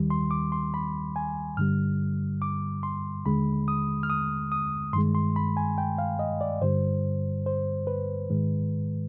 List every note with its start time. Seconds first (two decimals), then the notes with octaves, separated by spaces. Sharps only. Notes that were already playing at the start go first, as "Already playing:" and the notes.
Already playing: D#2 D#3 G3
0.10 C6
0.31 D6
0.52 C6
0.74 B5
1.16 G#5
1.57 G2 D3 G3 F6
2.42 D6
2.83 C6
3.25 D#2 D3 G#3 B5
3.68 D#6
4.03 F6
4.10 D#6
4.52 D#6
4.93 G2 D#3 G#3 C6
5.15 C6
5.36 B5
5.57 G#5
5.78 G5
5.98 F5
6.19 D#5
6.41 D5
6.61 G2 D3 G3 C5
7.46 C5
7.87 B4
8.30 G#2 D#3 G#3